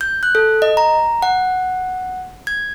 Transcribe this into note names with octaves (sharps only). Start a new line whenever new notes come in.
G6
F#6
A4
D#5
A#5
F#5
G#6